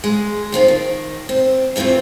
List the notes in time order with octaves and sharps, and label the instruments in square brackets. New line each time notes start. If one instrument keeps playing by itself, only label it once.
[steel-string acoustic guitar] G#3
D#3 F3 C4 F4
D#3
C4
F2 E3 A3 C4 F4